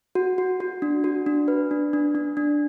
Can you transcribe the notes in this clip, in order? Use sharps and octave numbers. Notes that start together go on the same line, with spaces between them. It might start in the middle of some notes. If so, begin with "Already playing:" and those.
F#4
F#4
F#4
D4
F#4
D4
B4
D4
D4
D4
D4